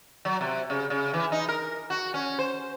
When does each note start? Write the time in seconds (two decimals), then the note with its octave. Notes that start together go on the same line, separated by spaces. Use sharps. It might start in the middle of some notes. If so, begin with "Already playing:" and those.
0.25 F#3
0.41 C3
0.70 C#3
0.90 C#3
1.13 E3
1.32 D#4
1.49 A#4
1.90 F#4
2.14 C#4
2.39 C5